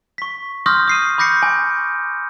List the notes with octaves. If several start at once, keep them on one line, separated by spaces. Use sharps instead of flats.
C#6 B6
C6 C#6 D#6 F6 G6 A#6
D#6 C7 D#7
B5 D6 G6 A#6 C7 C#7
G#5